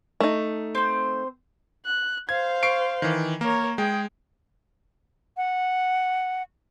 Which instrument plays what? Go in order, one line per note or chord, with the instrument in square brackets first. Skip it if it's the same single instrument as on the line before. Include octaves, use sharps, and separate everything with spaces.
[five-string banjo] A3 D#4
[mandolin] C4 C5
[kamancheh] F#6
[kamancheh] C5 F5 [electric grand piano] G#6
[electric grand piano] C#6 C7 D7
D#3 E3
[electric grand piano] A#3 [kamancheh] A#4 C#5
[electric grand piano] G#3 [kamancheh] G#4 G5
[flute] F#5